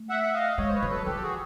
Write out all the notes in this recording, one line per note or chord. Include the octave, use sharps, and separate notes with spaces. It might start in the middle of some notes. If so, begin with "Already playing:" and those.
Already playing: A3
E5 F#5
F#5
D#5 F5
G#3 C#5 D#5
C5
B4 C#5
F#3
A4 B4
F3 G4 A4
F#4 G#4